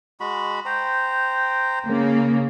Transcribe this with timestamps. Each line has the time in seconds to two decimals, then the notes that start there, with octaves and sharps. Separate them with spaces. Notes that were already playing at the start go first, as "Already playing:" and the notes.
0.20 G#3 F#4 B5
0.66 C5 G5 A#5
1.87 C#3 A#3